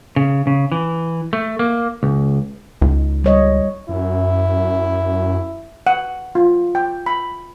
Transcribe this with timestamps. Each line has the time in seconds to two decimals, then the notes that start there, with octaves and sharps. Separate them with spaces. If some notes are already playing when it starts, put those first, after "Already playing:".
0.16 C#3
0.47 C#3
0.72 E3
1.33 A3
1.59 A#3
2.03 C#2
2.82 C#2 D#4
3.24 G3 C#5 D#5
3.89 F#2 E4
5.87 F#5
6.35 F4
6.75 G5
7.06 B5